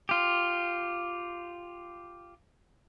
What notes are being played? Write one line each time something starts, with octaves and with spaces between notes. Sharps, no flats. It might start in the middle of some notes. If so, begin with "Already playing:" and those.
F4 G4